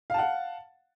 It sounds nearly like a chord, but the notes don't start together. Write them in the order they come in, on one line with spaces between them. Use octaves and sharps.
F5 A5 F#5